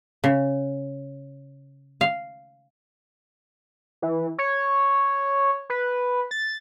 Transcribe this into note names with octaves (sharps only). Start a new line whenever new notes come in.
C#3
F5
E3
C#5
B4
A6